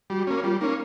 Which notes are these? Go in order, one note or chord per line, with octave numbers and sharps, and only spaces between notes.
G3 F#4
A#3 C#4
G3 F4
A#3 C#4 D#4